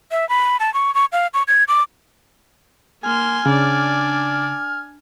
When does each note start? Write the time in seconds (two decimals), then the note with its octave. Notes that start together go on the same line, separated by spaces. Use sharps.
0.11 E5
0.29 B5
0.60 A5
0.74 C#6
0.95 C#6
1.12 F5
1.34 C#6
1.48 G#6
1.68 D6
3.04 A#3 G#5 C6 F6
3.46 C#3 D4 D5